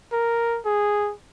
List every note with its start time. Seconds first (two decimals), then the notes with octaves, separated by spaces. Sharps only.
0.12 A#4
0.65 G#4